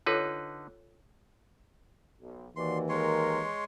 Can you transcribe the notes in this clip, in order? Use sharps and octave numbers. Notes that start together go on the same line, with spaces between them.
D3 D#4 F4 A4 B4 C#5
B1
D#2 E3 F#4 D5 C6
G#3 A#4 C#5 C6